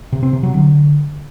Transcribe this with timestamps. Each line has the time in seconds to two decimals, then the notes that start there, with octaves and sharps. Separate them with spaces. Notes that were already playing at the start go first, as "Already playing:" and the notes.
0.12 C3
0.23 C4
0.33 C3
0.43 F#3
0.53 D3